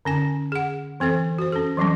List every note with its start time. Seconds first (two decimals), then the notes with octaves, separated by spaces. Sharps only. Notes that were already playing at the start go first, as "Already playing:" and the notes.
0.05 D3 C#4 G#5
0.52 G#4 F#5
1.00 E3 C4 A4 C5
1.38 F#4 C5
1.52 C#4 A4
1.77 E3 F#3 G3 C#4